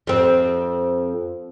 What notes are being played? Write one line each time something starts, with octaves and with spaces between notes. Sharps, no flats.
F2 C4